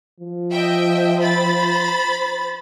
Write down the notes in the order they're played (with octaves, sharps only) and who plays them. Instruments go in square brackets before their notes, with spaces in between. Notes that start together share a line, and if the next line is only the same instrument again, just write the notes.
[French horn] F3
[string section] D#5 E5 G5
C5 B5 A6